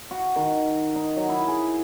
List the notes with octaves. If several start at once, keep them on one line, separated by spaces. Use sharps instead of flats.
F#4
D#3
D#4
F#3
E4
G#4